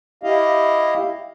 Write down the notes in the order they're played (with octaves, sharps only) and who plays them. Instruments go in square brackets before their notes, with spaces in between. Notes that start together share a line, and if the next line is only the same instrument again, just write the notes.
[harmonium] E4 G4 D#5 F5